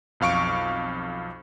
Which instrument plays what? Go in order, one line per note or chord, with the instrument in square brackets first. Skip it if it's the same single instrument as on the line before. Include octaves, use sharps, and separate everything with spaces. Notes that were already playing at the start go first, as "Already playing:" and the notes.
[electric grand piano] B1 F2 F5 C#6 D7